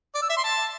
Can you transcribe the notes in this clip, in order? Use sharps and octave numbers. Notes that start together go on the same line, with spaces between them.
D5
E6
E5
C6
A5